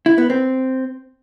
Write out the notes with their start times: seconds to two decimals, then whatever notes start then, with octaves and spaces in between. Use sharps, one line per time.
0.06 E4
0.18 B3
0.30 C4